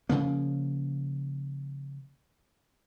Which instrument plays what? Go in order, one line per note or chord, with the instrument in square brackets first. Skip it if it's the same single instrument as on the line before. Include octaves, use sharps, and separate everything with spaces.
[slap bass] C#3 F3 A#3